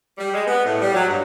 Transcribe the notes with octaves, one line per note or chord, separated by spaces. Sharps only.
G3
G#3
B3
A2
G3
F#3
G2